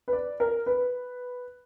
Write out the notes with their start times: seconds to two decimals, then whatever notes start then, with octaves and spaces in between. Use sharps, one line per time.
0.08 B4
0.13 D5
0.40 A#4
0.66 B4